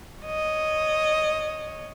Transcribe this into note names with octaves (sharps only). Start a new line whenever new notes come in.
C#5 D#5